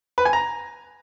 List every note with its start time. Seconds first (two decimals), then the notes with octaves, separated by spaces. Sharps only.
0.18 B4
0.25 G#5
0.33 A#5